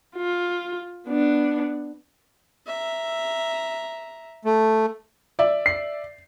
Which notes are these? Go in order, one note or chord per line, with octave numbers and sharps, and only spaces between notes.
F4
B3 D4
E5 A#5
A3
D5 E5
C7